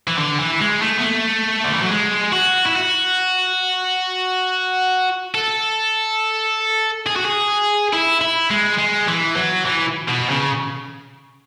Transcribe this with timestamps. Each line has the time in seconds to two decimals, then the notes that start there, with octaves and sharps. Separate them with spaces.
0.08 E3
0.18 D3
0.40 E3
0.61 G#3
0.82 A3
0.98 B3
1.04 A3
1.64 D3
1.73 E3
1.81 F#3
1.90 G#3
2.33 F#4
2.67 E4
2.76 F#4
5.35 A4
7.06 G#4
7.16 F#4
7.25 G#4
7.93 E4
8.21 E4
8.50 G#3
8.79 G#3
9.08 E3
9.36 F#3
9.65 E3
10.08 B2
10.29 C#3